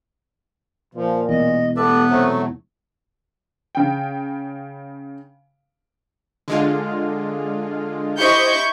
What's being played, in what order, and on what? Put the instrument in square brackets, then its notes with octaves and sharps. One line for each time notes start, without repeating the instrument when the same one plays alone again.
[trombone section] A#2 [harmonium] F3
[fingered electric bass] E1 E2 [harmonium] D#5
[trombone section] A3 G4 A4 [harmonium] B3 B4 [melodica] D5 E5
[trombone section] C3 C4 [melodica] F#3 A3
[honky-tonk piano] C#3 G5
[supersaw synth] D3 G#3 F4
[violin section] E4 C#6 G6 [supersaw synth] G4 C5 D#5